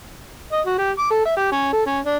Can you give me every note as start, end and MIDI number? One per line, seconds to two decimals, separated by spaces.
0.53 0.61 75
0.67 0.77 66
0.78 0.91 67
0.99 1.08 86
1.11 1.24 69
1.25 1.34 76
1.37 1.52 67
1.52 1.69 61
1.73 1.86 69
1.86 2.00 61
2.06 2.17 62